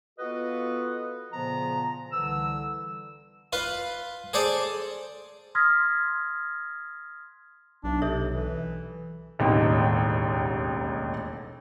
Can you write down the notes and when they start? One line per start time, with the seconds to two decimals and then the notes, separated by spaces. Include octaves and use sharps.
0.19 B3 F4 F#4 A4 B4 D#5
1.33 A#2 C#3 F3 B3 A#5
2.12 C2 D3 E3 E6
3.53 F4 B4 F5
4.33 G#4 A4 C5 D5 A5
5.55 C6 D#6 F6 G#6 A#6 B6
7.84 B1 D4
8.02 C3 A4 C#5 E5
8.34 E3
9.39 E1 A1 D#2 D#4